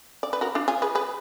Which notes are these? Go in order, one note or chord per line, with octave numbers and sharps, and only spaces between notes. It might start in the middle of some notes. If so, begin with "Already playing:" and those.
D5
B4
F#4 A#4
D4 F4
F4 G#4
G#4 B4
G#4 B4